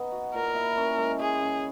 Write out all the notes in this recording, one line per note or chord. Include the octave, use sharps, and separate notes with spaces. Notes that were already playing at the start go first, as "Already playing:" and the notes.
Already playing: B3 D#4
F#4
A#2 A#4
E4
C#4
G#3
G#3 G#4
C#3